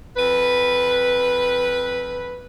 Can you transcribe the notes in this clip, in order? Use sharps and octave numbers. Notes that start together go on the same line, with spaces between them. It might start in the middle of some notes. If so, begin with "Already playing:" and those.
F2 B4